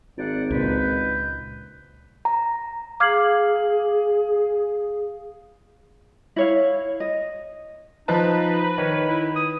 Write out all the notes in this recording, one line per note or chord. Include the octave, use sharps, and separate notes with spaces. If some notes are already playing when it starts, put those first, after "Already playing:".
G#1 C5 D5 F#5
C#2 A#2 G#3 B4 G6
A#5
G#4 F5 D6 F6 G#6 C7 F#7
E4 C#5 F5
D#5
F3 D#4 B4 D#5 A5
D#3 C#5
E4
D#6